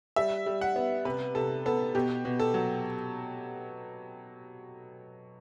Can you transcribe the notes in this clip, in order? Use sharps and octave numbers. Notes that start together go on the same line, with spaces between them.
G3 E5
G3
F#5
B3
C3 B4
C3 A4
B3 A4
B2 G4
B2
A4
F#3